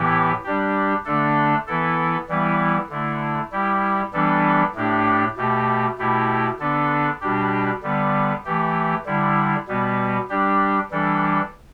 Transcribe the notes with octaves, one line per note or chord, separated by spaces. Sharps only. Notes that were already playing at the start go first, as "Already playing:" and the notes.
Already playing: A2 E3 B3 E4 G4
G3 D4 G4
D3 A3 D4 A4
E3 B3 E4 A4
E3 G3 B3 E4
D3 A3 E4
G3 E4 G4
E3 G3 B3 D4 A4
A2 A3 D4 G4
B2 A3 G4
B2 A3 E4 G4
D3 B3 D4 A4
B2 G3 D4 G4
D3 G3 B3
E3 A3 G4
D3 G3 E4
B2 G3 B3
G3 D4 G4
E3 G3 D4 A4